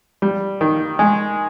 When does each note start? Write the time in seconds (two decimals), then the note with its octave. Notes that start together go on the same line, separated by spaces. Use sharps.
0.22 G3
0.61 D#3
0.99 G#3